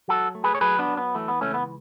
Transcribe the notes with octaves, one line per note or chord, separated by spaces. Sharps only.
F#3 F#4 A4
A3
G#4 B4
C#5
F#3 G#4 B4
B3 D4
F#3
B3
E3 A3
B3
C#2 A3 C#4
B3